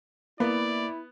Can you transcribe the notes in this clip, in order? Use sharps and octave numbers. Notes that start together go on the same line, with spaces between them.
A#3 B3 E4 D5